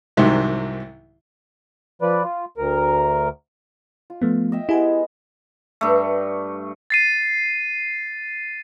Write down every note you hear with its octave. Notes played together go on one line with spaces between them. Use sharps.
C2 G#2 C3 D#3 F#3
F3 B4 D5
F4
D2 A#4
F4
F3 A3 B3
D#5 E5 G5
G#3 B3 E4 G4 G#5
G2 A3
A6 C7 D#7